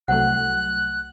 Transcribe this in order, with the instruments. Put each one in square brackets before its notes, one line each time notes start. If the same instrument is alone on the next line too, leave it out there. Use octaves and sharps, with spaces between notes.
[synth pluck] C2 F#3 A3 [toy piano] F#5 [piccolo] F#6